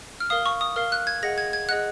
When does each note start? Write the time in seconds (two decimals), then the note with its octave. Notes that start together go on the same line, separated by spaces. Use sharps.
0.20 F6
0.30 A#4 F5 D#6
0.46 C#6
0.61 D#6
0.76 A#4 F5 F6
0.92 F#6
1.07 G#6
1.23 G#4 D#5 F#5 A#6
1.38 G#6
1.53 G#6
1.68 G#4 D#5 F#5 F#6